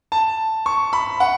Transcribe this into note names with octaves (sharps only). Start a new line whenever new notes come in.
A5
C#6
B5
F#5